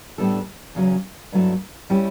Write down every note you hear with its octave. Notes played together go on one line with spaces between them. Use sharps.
A2 G3 B3 D4 A4
E2 C#3 F#3 C#4
G2 F#3 A3 E4
G3 C#4 E4 G4